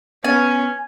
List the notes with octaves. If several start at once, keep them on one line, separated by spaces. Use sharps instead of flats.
B3 C#4 G#5